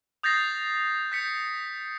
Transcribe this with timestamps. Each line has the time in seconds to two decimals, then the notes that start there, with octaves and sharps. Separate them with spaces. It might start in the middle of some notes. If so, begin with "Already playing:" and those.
0.23 D#6 G6 A6 A#6 C7
1.12 G6 B6 C#7